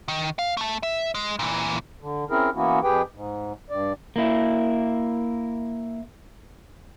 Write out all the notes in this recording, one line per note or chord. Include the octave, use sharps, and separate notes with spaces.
D#3
F5
A3 A5
E5
G#3
A#2 E3
D3
C4 C#4 E4 G#4 A#4
E3 A#3 B3 C#4 E4 F#4
F2 G4 G#4 B4 G5
G#2
G2 D5
A#3 E4